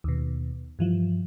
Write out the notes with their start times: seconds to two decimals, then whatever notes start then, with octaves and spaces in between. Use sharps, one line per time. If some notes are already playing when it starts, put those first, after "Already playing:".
0.04 D#2 B2
0.79 G2 E3 F3